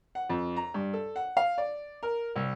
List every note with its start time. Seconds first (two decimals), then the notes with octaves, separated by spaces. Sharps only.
0.15 F#5
0.30 F2
0.56 A#5
0.74 G2
0.93 A4
1.16 F#5
1.37 F5
1.58 D5
2.03 A#4
2.36 C2